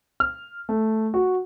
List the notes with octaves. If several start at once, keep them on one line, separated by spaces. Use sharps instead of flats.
F6
A3
F#4